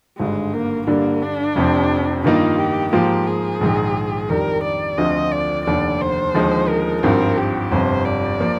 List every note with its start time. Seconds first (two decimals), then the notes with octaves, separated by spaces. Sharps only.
0.19 G#1 G2 D3 G#3
0.53 A#3
0.87 G2 D3 G3 A#3 D4
1.22 D4
1.55 F1 F2 C3 F3 C4
2.24 G2 D#3 A#3 D#4 F4
2.58 G4
2.93 G#2 F3 A#3 F4 G4
3.27 G#4
3.61 A#1 G#2 D#3
4.30 F2 D#3 G3 D4 A#4
4.64 D5
4.98 D2 D3 F3 C4 F4 D#5
5.32 D5
5.66 F1 D#2 D3 D5
6.01 C5
6.34 D#2 D3 F3 G#3 D#4
6.68 A#4
7.03 G#1 G2 F3 C4 A#4
7.38 G4
7.72 G1 F2 C3 C5
8.05 D5
8.40 F3 A#3